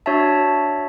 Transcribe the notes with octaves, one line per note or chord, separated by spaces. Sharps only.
D4 F#4 C#5 E5 A5